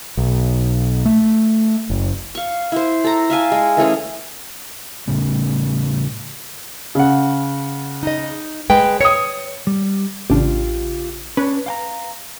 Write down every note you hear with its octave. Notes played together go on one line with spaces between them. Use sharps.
B1
A3
F#1
F5 C#6
E4 C5
A4 A#5
E5 F5 G#5 A5
G#3
E3 A3 C#4 G#4
A2 C#3 G3 A3
C#3 F#5
D#4 D#5
G#3 B4 G5
C#5 D#6 C#7
G3
A1 C#3 D4 F4 G4
C#4 D4 B4 C#5
F5 G5 A#5